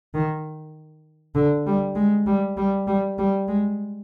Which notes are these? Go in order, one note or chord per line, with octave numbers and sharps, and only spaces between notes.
D#3
D3
G3
G#3
G3
G3
G3
G3
G#3